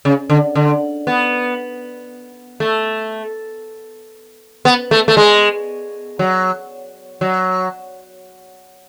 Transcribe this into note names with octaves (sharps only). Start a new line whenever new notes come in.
C#3
D3
D3
B3
A3
B3
A3
A3
G#3
F#3
F#3